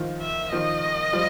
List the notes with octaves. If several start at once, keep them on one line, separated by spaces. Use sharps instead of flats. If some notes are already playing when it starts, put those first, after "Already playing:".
Already playing: D#3 F3
E5
D#3 F3 D#5
F3 G3